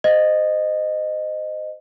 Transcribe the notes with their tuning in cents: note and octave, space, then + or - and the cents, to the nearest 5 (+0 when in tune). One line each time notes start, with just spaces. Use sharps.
C5 -20 D#5 -15